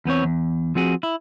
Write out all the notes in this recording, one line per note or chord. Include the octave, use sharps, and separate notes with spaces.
E2 B3 C4 C#5
E2
F3 C4 F#4 G#4
E4